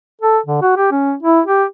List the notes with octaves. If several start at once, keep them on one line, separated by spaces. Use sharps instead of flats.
A4
D3
F#4
G4
C#4
E4
G4